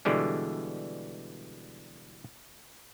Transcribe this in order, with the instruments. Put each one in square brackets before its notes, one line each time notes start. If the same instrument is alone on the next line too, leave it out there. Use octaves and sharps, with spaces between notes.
[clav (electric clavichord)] B2 D3 E3 G3 G#3